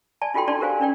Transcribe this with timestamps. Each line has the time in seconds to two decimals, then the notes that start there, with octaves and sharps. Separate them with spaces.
0.22 D5 G#5 A5
0.34 D#4 F4 F#4 A4 G5 C6
0.48 D4 D#4 D5 A5 C6
0.60 G4 A#4 C5 F5 G#5
0.80 C#4 D4 D5 G5